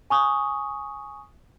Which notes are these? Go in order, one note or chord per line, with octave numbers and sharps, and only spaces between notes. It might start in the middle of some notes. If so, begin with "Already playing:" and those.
G#5 C#6 D#6